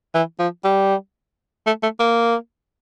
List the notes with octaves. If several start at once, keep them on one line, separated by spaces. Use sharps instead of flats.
E3
F3
G3
A3
A3
A#3